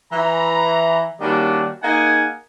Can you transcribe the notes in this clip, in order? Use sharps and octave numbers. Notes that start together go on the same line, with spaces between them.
E3 A#5
D#3 G3 A#3 C#4 D4 F#4
A#3 D#4 G#4 F#5 G#5